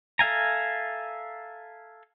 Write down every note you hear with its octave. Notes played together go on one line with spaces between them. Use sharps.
A4 E5 F5 G#5 A#5